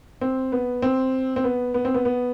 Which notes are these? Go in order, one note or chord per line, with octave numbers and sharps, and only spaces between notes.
C4
B3
C4
C4
B3
B3
C4
B3
B3